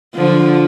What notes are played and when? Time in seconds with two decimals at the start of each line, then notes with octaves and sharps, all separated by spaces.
0.15 D3 F3